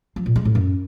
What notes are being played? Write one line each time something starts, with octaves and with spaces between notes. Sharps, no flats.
F3
A#2
G#3
A2
F#2